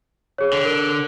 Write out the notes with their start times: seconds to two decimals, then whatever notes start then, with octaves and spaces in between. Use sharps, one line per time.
0.38 G#4 C#5
0.53 D3
0.65 A#4 D7